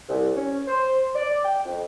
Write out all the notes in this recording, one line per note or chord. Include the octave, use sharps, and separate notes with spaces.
C2
C#4
C5
D5
G5
F2